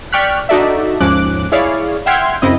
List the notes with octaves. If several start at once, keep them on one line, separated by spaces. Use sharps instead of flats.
D5 G5 C#6 F6 F#6 B6
D4 D#4 F#4 A4 D5 E5
D#2 G#2 F3 C#4 D6 F#6
E4 G#4 C#5 D5 F5
E5 F#5 G5 C6 F6 G#6
F#2 C#3 C4 E4 D#5